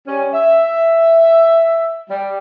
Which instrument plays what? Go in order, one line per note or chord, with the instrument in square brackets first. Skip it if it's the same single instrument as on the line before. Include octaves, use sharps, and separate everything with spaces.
[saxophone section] G3 C#4
E5
G3